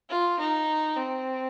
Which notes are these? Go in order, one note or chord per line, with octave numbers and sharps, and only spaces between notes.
F4
D#4
C4